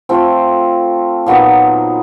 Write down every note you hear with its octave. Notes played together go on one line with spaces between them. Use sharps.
A3 C4 F4
A#2 F#3 B3 D#4